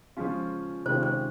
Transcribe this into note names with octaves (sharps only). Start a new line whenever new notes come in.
C#3 F3 G#3 C#4 F4
C3 D#3 G#3 C#4 F4 C5
C5